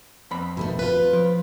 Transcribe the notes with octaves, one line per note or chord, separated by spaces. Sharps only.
F2 B5
B2 D#3 A3
F4 B4
F3